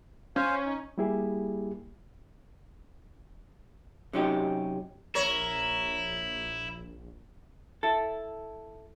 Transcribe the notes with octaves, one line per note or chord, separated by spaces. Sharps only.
C#4 C5 F5 G#5
D#4
G3 A#3 E4 G4 G#4
C3 F#3 C#4 D#4 G4
A#1 E4 A#4 C#5
E4 A4